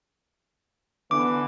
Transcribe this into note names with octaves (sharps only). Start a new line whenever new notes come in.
D3 E3 B3 D6